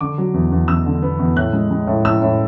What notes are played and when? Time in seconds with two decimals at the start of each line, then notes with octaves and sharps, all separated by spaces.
0.01 D3 D6
0.18 F#3
0.34 E2
0.52 E2
0.68 E2 E6
0.86 D3
1.02 B3
1.19 E2
1.36 A2 F#6
1.53 G#3
1.71 G#3
1.87 A2
2.05 A2 E6
2.22 A2